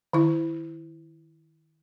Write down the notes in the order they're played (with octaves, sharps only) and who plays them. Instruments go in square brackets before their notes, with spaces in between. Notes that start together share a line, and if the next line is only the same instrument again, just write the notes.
[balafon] D#3 E4